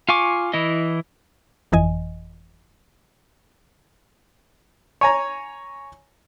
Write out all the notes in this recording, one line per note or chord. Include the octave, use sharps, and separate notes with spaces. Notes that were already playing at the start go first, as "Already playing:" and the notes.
F4 F5 G#5 C#6 D6
E3 E4 D#5
G1 F2 E3 D#5 G#5
C#5 G#5 A#5